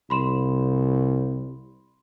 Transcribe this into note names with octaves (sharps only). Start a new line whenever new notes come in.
C2 B5 C6 E7